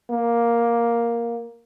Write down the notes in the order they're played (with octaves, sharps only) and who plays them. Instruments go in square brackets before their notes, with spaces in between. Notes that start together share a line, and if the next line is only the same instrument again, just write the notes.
[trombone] A#3